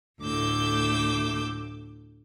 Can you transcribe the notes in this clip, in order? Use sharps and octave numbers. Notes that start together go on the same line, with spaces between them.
D2 A2 D6 E6 G6